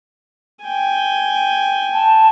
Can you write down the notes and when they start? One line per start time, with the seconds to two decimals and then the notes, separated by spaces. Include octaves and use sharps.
0.65 G5 G#5
1.93 A5